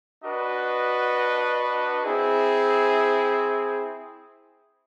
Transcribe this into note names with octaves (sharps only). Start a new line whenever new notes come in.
D4 F#4 B4 D#5
C4 E4 G#4